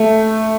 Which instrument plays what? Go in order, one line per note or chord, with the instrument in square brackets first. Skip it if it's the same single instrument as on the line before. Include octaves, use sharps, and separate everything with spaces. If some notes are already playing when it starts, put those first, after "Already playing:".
Already playing: [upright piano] A3